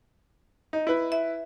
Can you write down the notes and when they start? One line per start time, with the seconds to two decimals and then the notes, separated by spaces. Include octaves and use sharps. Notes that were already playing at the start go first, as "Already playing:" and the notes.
0.73 D#4
0.87 E4 B4
1.12 E5